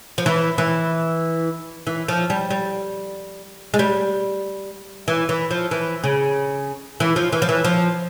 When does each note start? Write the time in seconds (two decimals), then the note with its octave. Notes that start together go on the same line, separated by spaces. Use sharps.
0.18 F3
0.26 E3
0.58 E3
1.87 E3
2.08 F3
2.30 G3
2.50 G3
3.74 G#3
3.79 G3
5.08 E3
5.29 E3
5.51 F3
5.71 E3
6.04 C#3
7.00 E3
7.16 F3
7.32 E3
7.42 F3
7.49 E3
7.64 F3